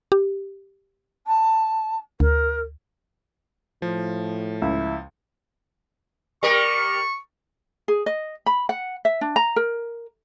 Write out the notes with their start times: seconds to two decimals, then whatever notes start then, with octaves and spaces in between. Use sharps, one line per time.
0.12 G4
1.27 A5
2.20 D2 A#4
3.82 A2 F3
4.62 C#2 E4
6.43 G3 A#4 C#6
7.88 G#4
8.06 D#5
8.46 B5
8.69 F#5
9.05 E5
9.21 D4
9.36 A#5
9.56 A#4